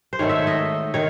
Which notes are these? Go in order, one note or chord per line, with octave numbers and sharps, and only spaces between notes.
C5
G#2 D#3 A3 C#5
E5
D#5
D#3 C#5